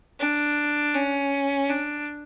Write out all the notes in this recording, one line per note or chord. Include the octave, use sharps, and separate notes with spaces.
D4
C#4
D4